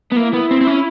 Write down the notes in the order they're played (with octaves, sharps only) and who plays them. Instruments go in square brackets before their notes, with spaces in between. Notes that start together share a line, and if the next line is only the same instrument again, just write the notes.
[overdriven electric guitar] B3
[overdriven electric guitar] A#3 [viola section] E4
[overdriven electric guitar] B3
C4
C4
C#4